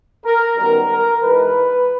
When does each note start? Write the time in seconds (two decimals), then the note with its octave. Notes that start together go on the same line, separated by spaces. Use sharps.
0.25 A#4
0.56 F#2 D#3 G3 B3 A#4
0.90 A#4
1.22 G#2 E3 G#3 B4